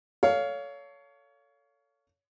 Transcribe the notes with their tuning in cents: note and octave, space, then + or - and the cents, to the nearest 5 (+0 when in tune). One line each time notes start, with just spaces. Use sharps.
A4 +15 C#5 +25 F5 +0